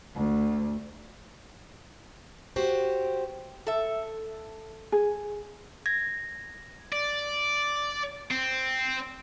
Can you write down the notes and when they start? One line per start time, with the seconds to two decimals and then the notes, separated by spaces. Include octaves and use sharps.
0.16 D2
2.56 F#4 G4 C5
3.67 A4 E5
4.92 G#4
5.86 G#6 A#6
6.92 D5
8.31 C4